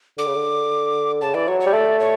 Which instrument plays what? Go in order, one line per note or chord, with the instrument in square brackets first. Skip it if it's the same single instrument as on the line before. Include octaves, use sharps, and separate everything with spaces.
[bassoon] D3 [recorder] D6
[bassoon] C#3
D3
[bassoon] C#3 [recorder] A5
[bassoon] E3 [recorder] D5
[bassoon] F#3 [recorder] C#5
[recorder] C#5
[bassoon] G3
[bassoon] A3 [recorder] D5
[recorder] C#5